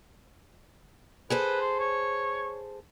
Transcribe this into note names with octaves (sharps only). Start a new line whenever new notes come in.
G#4 A4 B4 C5
C6
C#5